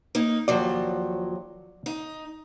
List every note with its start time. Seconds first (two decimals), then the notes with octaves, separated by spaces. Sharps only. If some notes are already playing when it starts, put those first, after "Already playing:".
0.15 A#3 D#4
0.48 D#2 F3 F#3 D5
1.86 D#4